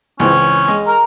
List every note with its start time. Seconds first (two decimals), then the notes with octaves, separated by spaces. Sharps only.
0.20 C#2 E3 C4 C#4
0.68 G#3
0.87 A#4 A#5